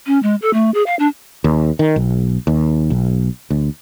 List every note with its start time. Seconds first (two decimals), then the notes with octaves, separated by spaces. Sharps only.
0.07 C#4
0.23 G#3
0.42 A4
0.53 A3
0.74 G#4
0.86 F5
0.99 D4
1.44 D#2
1.79 D#3
1.96 B1
2.47 D#2
2.90 B1
3.50 D2